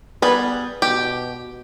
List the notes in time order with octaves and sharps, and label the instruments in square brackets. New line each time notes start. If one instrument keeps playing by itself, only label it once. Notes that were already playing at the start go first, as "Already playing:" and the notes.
[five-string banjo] G3 G#4 B4 [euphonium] B3
[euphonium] B2 [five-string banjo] G4